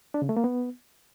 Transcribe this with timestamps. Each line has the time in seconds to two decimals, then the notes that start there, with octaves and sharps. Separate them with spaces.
0.14 D4
0.22 C#3
0.29 A3
0.37 A#3
0.44 B3